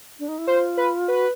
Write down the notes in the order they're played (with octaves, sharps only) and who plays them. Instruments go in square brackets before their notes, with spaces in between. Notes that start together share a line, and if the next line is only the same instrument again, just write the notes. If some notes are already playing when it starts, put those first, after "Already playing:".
[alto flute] D4
D#4
E4
[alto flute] F4 [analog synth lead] C5
[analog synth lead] B4
[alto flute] F#4 [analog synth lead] B4